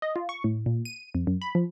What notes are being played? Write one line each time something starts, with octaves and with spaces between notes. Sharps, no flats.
D#5
F4
C#6
A2
A#2
D#7
F2
F#2
B5
F3